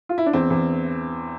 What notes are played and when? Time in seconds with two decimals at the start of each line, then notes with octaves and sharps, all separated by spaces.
0.09 F4
0.18 E4
0.26 D4
0.33 E2 C4
0.50 E2